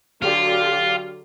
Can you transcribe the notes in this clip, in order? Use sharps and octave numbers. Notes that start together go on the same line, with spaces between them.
D3 F#3 F4 G4